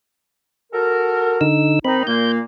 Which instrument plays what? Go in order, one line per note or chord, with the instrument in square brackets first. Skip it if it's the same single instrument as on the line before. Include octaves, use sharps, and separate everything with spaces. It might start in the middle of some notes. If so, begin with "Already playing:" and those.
[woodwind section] F#4 A4 A#4
[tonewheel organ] D3 D#4 E6
[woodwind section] D#3 D#4 [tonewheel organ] C4 B5
[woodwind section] A#2 A#3 [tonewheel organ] G6